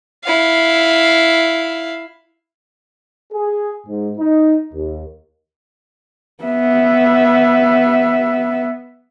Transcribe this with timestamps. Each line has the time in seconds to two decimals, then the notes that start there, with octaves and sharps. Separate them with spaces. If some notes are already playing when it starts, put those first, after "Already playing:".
0.25 E4 F5
3.32 G#4
3.87 G#2
4.18 D#4
4.74 D#2
6.44 B3 E5